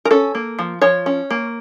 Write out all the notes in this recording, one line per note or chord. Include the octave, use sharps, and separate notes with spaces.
A#4
C#4 A4
A#3
F3
F3 C#5
C#4
A#3